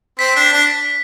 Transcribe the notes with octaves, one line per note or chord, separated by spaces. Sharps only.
C4 B6
D4
D4